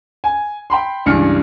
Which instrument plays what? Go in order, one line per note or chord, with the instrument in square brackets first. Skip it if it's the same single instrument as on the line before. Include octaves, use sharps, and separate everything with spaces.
[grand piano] G#5
G5 B5 C6
C#2 G2 E3 G3 F6 C#7